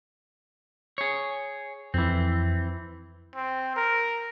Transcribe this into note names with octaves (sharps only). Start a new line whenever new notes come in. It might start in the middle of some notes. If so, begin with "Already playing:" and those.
G#4 C#5
F2 E3 C4
C4
A#4